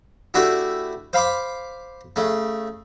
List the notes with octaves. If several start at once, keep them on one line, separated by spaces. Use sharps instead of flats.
A3 D4 E4 F#4 G4
C5 F5 B5 C6 D6
C#3 A3